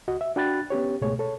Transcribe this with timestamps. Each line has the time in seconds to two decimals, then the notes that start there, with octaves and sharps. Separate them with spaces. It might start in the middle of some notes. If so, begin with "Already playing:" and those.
0.08 C#2 F#4 D#5
0.21 E5
0.36 D4 F#4 G5 B5 F#6 A6
0.70 B3 C#4 G4 C#5
1.01 C#2 G#2 B2 A3 G#4 C#5
1.19 A4 C#5